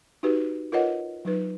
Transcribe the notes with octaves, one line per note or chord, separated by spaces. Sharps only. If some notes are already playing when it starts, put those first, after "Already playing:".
D#4 F#4 G4 B4
F4 A#4 B4 C#5 D#5 F#5
F#3 D#4 B4